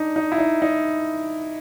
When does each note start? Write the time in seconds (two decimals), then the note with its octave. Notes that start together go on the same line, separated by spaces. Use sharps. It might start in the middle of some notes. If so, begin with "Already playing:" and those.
Already playing: D4 D#4
0.16 D#4
0.32 E4
0.38 D#4
0.62 D#4